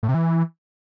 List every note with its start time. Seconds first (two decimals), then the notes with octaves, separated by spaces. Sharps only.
0.03 A2
0.09 C3
0.14 E3